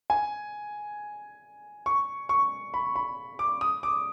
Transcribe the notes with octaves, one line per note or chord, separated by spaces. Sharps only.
G#5
C#6
C#6
B5
B5
D6
D#6
D6